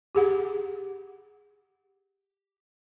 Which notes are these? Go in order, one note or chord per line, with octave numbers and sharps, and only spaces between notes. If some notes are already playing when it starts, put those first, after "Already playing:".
G4 G#4 F#5